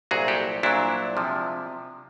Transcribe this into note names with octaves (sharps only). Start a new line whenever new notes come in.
C2 A#2 F#3 F#4 G#4
G4 A4
C2 A#2 F#3 D4 E4
C3 F3 G#3